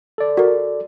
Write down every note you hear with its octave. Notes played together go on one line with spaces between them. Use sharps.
A4 D5
F#4 A#4